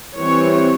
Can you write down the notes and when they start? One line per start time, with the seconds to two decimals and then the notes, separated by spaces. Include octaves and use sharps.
0.18 E3 G3 C4 C#5